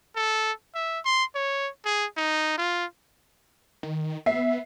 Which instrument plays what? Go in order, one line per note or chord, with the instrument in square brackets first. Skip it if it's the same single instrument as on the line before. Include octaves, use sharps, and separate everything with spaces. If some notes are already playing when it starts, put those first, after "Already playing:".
[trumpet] A4
E5
C6
C#5
G#4
D#4
F4
[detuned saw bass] D#3
[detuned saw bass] B3 [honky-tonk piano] E5 C7